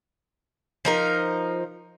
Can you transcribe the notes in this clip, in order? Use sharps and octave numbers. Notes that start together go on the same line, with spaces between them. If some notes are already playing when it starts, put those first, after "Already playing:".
F3 D#4 A#4